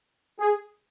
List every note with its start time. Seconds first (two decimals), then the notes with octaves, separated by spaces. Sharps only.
0.40 G#4